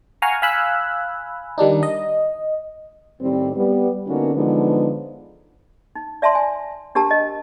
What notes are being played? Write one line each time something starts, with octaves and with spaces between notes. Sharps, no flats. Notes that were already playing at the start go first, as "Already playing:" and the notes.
F5 F#5 G#5 A#5 C#6 F6
F5 G#5 B5 E6 F#6
D#3 G3 D4 D#4
D#5
A2 D#3 G3 C4
G3 B3
D3 A#3 B3 C#4 D#4 F#4
D3 E3 F3 G#3 B3 D#4
D#4
D5 E5 A5 A#5 C6
G#5
D4 G4 A#4 A5 A#5
D#5